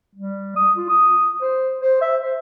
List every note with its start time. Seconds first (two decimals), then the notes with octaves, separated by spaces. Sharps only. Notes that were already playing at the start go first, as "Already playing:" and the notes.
0.15 G3
0.56 D#6
0.77 F4
0.89 D#6
1.42 C5
1.81 C5
2.01 E5
2.22 C5